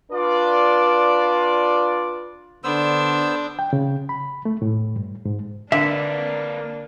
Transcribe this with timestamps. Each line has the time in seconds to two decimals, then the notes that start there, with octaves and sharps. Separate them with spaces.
0.12 D4 F4 B4 D5
2.64 D3 B3 D4 C5 E6
3.59 G5
3.73 C#3
4.09 B5
4.45 A3
4.62 A2
4.96 G2
5.25 G#2
5.72 D3 A#3 D4 B4 E5